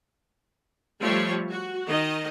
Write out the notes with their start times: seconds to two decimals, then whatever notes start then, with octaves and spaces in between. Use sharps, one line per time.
1.00 F3 G3 A3 C#5 E5
1.50 F#4
1.87 D#3 D#5